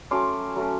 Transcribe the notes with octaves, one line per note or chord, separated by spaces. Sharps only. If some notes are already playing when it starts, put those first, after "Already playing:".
F#3 A3 C#4 C6 D6
F#3 A3 C#4